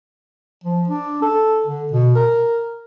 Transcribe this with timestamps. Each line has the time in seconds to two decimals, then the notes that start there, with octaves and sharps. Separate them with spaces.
0.64 F3
0.88 D4
1.22 A4
1.66 D3
1.92 B2
2.15 A#4